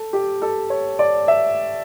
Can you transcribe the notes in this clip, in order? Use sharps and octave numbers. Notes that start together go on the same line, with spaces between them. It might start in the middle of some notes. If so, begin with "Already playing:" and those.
Already playing: A4
G4
A4
C#5
D5
E5